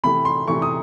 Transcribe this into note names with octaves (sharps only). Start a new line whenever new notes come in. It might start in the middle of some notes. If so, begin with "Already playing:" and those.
C3 E3 A3 B5
C6
C3 E3 A3 C#6
D#6